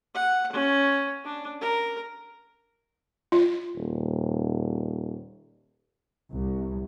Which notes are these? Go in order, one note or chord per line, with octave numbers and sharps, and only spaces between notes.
F#5
C#4
D4
A#4
F4
D#1
C2